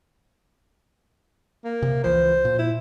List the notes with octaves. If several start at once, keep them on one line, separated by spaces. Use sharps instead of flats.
A#3
C3
C#2 E3 F3 C5
A#2
E4